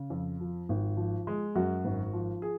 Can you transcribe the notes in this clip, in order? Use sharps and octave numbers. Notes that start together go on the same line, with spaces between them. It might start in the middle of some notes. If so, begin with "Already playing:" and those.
Already playing: C#3
F2
F3
G#1
F3
G#3
F#2 F#4
G#1
F3
G#4